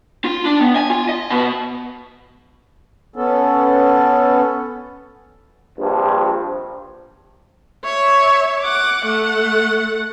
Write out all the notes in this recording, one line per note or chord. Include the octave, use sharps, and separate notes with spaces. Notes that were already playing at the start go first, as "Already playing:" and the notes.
F4
D4
B3
G#5
F4
D#5
B2
B3 C#4 A4
A#1 G2 F3 C4
C#5 E5
F#5 D6
A3 F#5